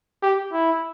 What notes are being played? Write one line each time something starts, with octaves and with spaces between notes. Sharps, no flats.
G4
E4